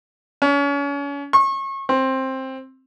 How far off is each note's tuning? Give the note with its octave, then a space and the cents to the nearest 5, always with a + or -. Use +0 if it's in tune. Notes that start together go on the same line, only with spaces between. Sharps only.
C#4 +35
C#6 -30
C4 +15